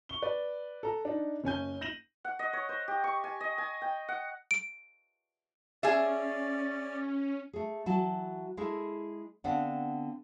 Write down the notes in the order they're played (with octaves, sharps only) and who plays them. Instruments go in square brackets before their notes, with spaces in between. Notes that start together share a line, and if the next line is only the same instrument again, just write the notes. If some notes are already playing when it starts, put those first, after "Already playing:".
[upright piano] C#6 G7
B4 D5
A4 A#5
D4 D#4
F#1 C#4 G#5 G6
G6 A#6 D#7 E7 F#7
[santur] F#5
D#5
C#5
C5
G4
C#6
G#5
D#5
G#5
G5
F#5
[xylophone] D7
[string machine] C#4 [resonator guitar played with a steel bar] G#4 E5 [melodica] D5
[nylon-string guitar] A3 G#4
E3 F#3 F#4 A5
G#3 E4 G#4 A4
D3 B3 C4 D4 F5 F#5